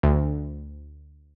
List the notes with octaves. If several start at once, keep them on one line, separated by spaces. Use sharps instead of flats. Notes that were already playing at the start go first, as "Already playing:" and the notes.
D2